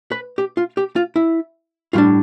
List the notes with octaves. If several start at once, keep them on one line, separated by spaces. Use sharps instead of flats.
B4
G4
F4
G4
F4
E4
A2 G3 D4 F4